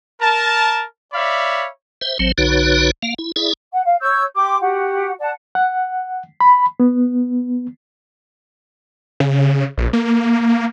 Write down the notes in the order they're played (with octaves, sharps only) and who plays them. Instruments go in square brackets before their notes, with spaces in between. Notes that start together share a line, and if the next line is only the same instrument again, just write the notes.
[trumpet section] A#4 A5
C#5 D5 E5 F5 B5
[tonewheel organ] C5 E5
A1 F#3 C4 C5
B1 D3 D#4 F#4 B4 C#5
A#3 F5
E4
E4 G#4 D5 E5
[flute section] F#5
F5
C#5 C#6 E6 G6
G4 G5 C6 D6
F#4 G4 F#5
D5 F#5 A5
[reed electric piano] F#5
B5
B3
[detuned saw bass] C#3
A#1
A#3